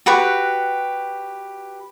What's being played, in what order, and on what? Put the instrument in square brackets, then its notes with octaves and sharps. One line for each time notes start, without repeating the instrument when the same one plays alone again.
[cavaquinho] F#4 G4 B4 F#5